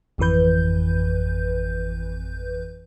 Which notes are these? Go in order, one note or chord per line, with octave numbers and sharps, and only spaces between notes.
G#1 F2 E3 B4 G6